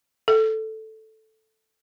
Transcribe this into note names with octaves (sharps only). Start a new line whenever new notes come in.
A4